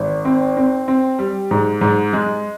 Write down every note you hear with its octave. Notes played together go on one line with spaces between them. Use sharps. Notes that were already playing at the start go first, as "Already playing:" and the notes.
Already playing: G#1
C4
C4
C4
G3
G#2
G#2
G#3